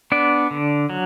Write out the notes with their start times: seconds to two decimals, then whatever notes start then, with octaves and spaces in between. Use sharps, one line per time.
0.12 B3 D4 D5
0.51 D3
0.90 F#3